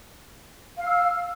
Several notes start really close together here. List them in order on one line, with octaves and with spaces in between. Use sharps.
F5 F6 E6